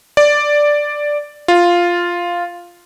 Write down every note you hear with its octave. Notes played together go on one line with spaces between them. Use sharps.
D5
F4